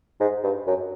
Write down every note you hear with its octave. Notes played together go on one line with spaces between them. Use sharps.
G#2
G2
F#2